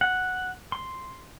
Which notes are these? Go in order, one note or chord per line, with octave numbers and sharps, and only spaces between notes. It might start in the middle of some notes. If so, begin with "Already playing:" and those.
F#5
C6